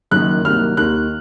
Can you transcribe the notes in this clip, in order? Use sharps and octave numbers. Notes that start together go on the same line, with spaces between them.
F#1 F#2 D#3 A#3 F#6
C2 C3 D#3 F#3 A#3 F6
D#2 D#3 A#3 F#6